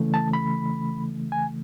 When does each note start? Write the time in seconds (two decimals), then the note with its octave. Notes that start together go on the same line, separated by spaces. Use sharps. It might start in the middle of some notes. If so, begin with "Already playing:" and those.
Already playing: C#3 E3 A3
0.14 A5
0.33 B5
1.32 G#5